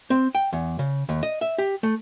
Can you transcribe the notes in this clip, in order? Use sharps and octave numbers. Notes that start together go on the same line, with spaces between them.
C4
G5
E2
C#3
D#2
D#5
E5
G4
A3